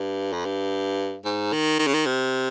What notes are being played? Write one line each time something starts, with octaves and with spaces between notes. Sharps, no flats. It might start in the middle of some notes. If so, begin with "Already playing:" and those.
Already playing: G2
F2
G2
G#2
D#3
D#3
C#3
D#3
C3